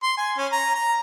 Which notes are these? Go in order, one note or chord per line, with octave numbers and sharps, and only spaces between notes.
C6
G#5
C#4
A#5
A#5